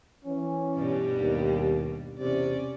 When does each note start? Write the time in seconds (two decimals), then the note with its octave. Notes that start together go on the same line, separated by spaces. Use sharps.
0.25 E3 C#4
0.77 G2 B2 G3
1.18 D#2
2.18 E2 C3 C#4 D5